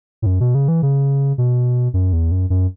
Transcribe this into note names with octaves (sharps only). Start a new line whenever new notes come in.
A2
F#2
B2
C#3
E3
C#3
B2
F#2
E2
F#2
F#2